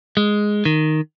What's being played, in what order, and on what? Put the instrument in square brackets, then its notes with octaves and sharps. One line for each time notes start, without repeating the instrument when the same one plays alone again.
[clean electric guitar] G#3
D#3